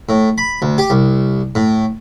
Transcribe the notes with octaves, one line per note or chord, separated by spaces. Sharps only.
A2
B5
D2
G4
C2
A2